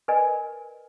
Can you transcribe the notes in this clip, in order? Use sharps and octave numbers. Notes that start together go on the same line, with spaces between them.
A#4 B4 D5 D#5 G#5